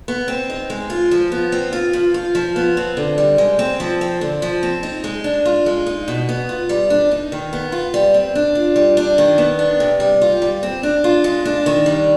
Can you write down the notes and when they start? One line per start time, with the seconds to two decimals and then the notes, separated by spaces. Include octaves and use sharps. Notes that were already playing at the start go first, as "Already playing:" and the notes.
0.08 B3
0.28 C4
0.50 D#4
0.70 G#3
0.90 F4
1.11 F3
1.32 B3
1.52 C4
1.73 F4
1.93 F3
2.14 F4
2.35 F3
2.56 B3
2.77 C4
2.97 D3
3.18 G3
3.38 G#3
3.59 C4
3.80 F3
4.01 C4
4.21 D3
4.42 F3
4.63 C4
4.83 D#4
5.04 G#3
5.24 D4
5.46 F4
5.66 G#3
5.86 D#4
6.08 B2
6.29 B3
6.49 F4
6.69 G3
6.90 D4
7.11 D#4
7.32 D#3
7.53 B3
7.72 F4
7.94 G3
8.14 C4
8.35 D4
8.55 F4
8.76 G3
8.97 D4
9.18 D#3
9.38 B3
9.59 D4
9.80 C3
10.00 G3
10.22 F4
10.42 G3
10.63 C4
10.83 D4
11.04 F4
11.24 G#3
11.45 D4
11.66 D#3
11.86 G3